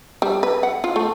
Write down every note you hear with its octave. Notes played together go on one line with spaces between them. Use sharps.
G3
B4
F#5
F4
A3